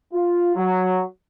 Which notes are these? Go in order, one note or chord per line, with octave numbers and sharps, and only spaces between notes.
F4
F#3